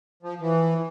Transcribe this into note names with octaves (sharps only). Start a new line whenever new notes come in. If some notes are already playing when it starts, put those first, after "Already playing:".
F3
E3